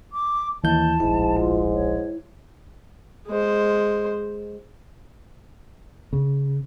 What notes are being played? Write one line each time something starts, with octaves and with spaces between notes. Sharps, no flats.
D6
D#2 E3 A5 G6
D1 A#1 G#2 E4
F4
C#5
G#3 C5
C#3